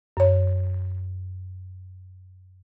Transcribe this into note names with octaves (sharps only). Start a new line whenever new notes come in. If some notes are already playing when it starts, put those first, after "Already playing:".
F#2 C#5